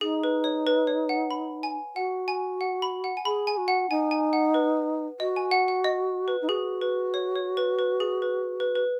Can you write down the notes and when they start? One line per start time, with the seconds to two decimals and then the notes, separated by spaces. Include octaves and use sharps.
0.01 D#4 G#4
0.24 B4
0.44 C#5
0.67 B4
0.87 C#5
1.09 F#5
1.31 B5
1.63 G#5
1.96 F#4 F#5
2.28 G#5
2.61 F#5
2.82 B5
3.04 F#5
3.17 G#5
3.25 G#4 B5
3.47 G#5
3.57 F#4
3.68 F#5
3.90 D#4 G#5
4.11 G#5
4.33 F#5
4.54 B4
5.20 F#4 D#5
5.36 G#5
5.51 F#5
5.68 F#5
5.84 D#5
6.28 B4
6.42 D#4
6.49 F#4 G#4
6.81 B4
7.14 C#5
7.36 C#5
7.57 B4
7.79 B4
8.00 G#4
8.22 B4
8.60 B4
8.75 B4